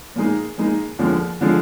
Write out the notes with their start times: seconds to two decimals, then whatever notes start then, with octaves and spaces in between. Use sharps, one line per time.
0.16 A#2 G#3 D#4
0.58 A#2 G#3 D#4
0.99 D#2 D3 F3 G#3
1.41 D3 F3 G#3